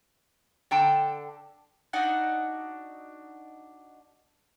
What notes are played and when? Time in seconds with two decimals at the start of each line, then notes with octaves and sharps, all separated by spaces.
0.71 D3 G5 A5
1.93 D4 D#4 F#4 F#5